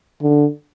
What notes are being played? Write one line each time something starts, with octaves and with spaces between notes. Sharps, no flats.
D3